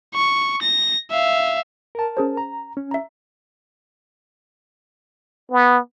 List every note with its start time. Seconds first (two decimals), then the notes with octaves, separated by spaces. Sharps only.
0.15 C#6
0.62 A#6
1.11 E5 F5
1.95 A#4 A5
2.17 C#4 G#4 C5
2.37 A#5
2.77 C#4
2.91 E5 A#5
5.52 B3